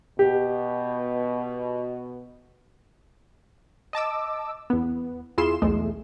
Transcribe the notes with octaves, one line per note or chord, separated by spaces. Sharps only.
B2 G4
D#5 A5 D6 E6
E2 B3
E2 E4 F4 G#4 C6 E7
B1 E2 G#3 A3